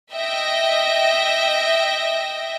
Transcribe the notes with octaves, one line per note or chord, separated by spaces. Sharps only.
D#5 E5 G5 A#6